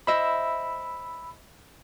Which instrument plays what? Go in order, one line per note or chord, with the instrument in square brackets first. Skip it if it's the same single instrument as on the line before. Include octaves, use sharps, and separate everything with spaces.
[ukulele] C5 D#5 E5 [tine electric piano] B5 E6